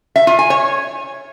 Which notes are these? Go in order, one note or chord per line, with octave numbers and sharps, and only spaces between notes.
E5
F4
G#5
C#5